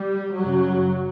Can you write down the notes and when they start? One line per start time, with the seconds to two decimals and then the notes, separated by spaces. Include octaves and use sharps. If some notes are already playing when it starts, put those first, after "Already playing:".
Already playing: G3
0.36 F#2 C#3 F#3